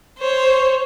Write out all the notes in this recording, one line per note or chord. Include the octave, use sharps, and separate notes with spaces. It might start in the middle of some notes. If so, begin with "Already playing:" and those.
C5 C#5